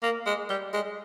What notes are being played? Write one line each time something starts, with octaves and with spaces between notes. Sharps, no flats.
A#3
G#3
G3
G#3